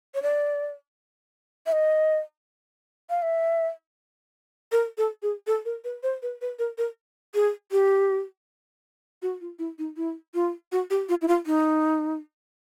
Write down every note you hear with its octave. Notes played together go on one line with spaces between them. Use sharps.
C#5
D5
E5
D#5
F5
E5
A#4
A4
G#4
A4
A#4
B4
C5
B4
B4
A#4
A#4
G#4
G4
F#4
F4
E4
D#4
E4
F4
F#4
G4
F4
E4
F4
D#4